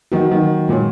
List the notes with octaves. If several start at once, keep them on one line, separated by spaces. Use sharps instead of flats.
D#3 F#3 A#3 D#4 F#4
D#3
A#2 G#3 F#4 C#5